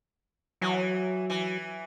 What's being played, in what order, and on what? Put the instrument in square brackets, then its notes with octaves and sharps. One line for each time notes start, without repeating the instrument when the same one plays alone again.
[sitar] E3 [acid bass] F#3
[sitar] E3